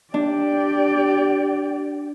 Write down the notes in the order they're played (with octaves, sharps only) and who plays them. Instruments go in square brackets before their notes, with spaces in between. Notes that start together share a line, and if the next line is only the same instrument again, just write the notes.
[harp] D4 [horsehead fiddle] G4 D5